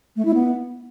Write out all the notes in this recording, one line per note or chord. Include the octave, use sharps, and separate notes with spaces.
A3
E4
B3